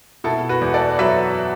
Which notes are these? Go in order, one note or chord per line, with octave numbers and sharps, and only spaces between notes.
B2 E4 A4
F#4 B4
E2
A4 D5
F#3 B4 E5